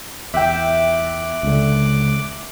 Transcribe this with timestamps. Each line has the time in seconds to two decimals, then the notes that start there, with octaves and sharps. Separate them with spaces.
0.34 E2 E5 G5 D6 F#6
1.43 C#2 D3